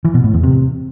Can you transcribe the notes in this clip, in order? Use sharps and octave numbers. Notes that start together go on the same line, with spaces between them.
E3
B2
A2
E2
C3